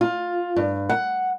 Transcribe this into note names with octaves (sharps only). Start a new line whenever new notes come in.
F4
G2
F#5